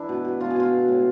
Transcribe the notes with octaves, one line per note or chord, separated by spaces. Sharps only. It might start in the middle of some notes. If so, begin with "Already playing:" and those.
Already playing: E3 D4 E4
B2
B2
B2 F4
G#4
B2 F4
B2
A2